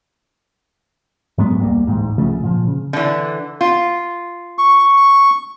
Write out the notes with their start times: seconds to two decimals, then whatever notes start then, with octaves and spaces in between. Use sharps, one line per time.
1.38 G#2 F#3 G#3 B3
1.59 E1 C#2 G3 A#3
1.87 D1 A1 G#2
2.18 C2 C#3 F3 A3
2.44 A#2 F3
2.67 C#3
2.93 D3 E3
3.61 F4
4.58 C#6